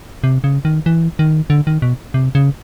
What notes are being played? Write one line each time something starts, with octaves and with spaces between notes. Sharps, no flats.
C3
C#3
D#3
E3
D#3
D3
D#3
B2
C3
C#3